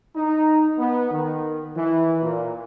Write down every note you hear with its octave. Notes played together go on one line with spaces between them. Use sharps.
D#4
B3
D#3
E3
A#2